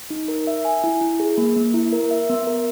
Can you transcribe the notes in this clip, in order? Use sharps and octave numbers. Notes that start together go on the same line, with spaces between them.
D#4
A#4
E5
G#5
E4
E4
G#4
A#3
A#3
E4
A#4
E5
B3
A#4